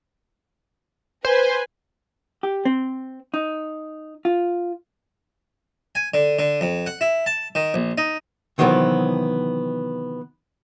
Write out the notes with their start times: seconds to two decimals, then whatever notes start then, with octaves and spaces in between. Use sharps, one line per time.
1.25 B4 C5 G#5
2.43 G4
2.65 C4
3.34 D#4
4.25 F4
5.95 G#5
6.14 D3
6.39 D3
6.61 F2
6.86 F#5
7.01 E4
7.26 A5
7.55 D#3
7.74 A#1
7.98 D#4
8.58 C3 D#3 E3 F#3 B3 C4